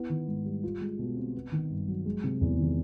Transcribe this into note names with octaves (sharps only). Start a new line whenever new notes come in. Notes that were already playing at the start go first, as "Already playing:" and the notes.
Already playing: B3 E4
D#3
G#2
G3
F4
G#3
B2
C4
B3
D#3
G2
F#3
G#3
C3
E2
D#3